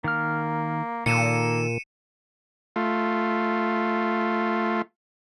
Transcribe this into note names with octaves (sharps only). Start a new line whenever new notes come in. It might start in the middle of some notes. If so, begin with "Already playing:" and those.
D#3 A#3 F6
A#2 D#3 A#3 A4 C#7 D#7 E7
A3 F4